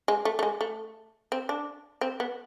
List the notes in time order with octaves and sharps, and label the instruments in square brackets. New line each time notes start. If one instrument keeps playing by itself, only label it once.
[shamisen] G#3
A3
A3
G#3
A3
C4
D4
C4
B3